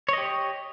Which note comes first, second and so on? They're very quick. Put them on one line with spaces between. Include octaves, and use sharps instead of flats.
C#5 D#5 G4